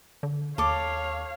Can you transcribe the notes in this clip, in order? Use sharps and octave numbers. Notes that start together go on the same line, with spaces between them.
D3
D#2 A4 C#5 F5 D6